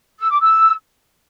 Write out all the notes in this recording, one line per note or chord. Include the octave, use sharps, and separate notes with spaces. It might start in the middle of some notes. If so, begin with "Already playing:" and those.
E6
D6
E6